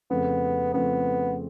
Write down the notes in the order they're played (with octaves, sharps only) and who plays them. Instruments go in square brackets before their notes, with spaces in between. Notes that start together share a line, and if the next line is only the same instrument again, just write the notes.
[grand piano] F2 C#3 F3 A3 C4 [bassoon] B3
[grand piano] F2 C#3 F3 A3 C4 [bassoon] B3